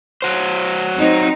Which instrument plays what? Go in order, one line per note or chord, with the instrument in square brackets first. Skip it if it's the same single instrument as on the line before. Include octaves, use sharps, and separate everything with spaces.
[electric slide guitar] F#3 F#4 C5
[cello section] C4 D#4